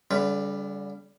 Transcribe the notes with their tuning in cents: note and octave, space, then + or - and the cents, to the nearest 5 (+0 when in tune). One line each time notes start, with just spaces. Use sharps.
D3 -45 G3 +10 B4 +0